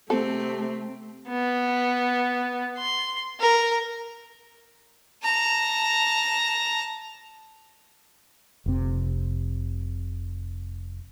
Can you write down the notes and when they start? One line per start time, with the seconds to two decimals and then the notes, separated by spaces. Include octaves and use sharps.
0.10 C3 A3 C4 A4
1.29 B3
2.77 C6
3.40 A#4
5.23 A5 A#5
8.66 F1 C3